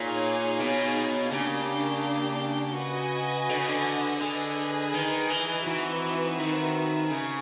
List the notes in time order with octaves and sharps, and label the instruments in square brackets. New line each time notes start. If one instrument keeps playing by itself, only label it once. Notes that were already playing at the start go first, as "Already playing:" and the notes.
Already playing: [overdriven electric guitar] A#2 [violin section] D#4 G#4 C#5 F5 G#5
[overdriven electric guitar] B2
[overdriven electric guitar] C#3 [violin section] A#3 D4 G4
[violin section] F#4 B4 D#5 G#5
[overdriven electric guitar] D3
C#3
D3
[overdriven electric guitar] D3 [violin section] G#4 B4 D#5 G#5
[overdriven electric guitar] D#3
E3
[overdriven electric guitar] E3 [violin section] C4 D#4 F#4 B4 E5
[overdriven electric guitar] D#3
[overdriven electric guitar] C#3 [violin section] G#4